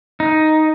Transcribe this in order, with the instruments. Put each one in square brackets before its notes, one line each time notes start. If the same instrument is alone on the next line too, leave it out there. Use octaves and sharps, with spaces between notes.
[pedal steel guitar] D#4